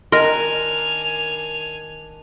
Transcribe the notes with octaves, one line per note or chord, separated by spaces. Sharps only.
D#3 D4 A#4 D#5 G#5 C6 F7